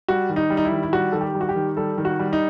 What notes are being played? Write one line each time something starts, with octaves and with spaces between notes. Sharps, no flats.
G3 F#4
D#3
D#4
G3
D#4
E4
D#3
E4
G3 F#4
D#3 A4
G4
G3
F#4
G4
D#3
G3 A4
D#3
F#4
G3
D#4